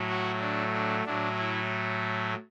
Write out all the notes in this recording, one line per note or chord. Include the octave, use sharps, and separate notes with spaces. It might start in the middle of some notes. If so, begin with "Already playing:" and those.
Already playing: A2 F#3 A3
F#4
D4
D4
A2 F#3 A3 D4
E4